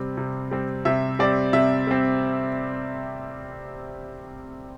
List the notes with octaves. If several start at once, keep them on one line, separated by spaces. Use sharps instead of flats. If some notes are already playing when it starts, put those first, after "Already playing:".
Already playing: C3 G3 C4
C3
G3 C4
C3 E5
G3 C4 D5
C3 E5
G3 C4